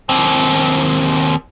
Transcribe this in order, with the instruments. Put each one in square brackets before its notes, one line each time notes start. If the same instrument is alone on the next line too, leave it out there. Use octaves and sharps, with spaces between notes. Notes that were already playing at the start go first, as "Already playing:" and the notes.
[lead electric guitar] D#2 C4